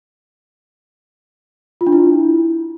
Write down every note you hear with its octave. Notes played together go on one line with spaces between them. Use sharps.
F4
D4
E4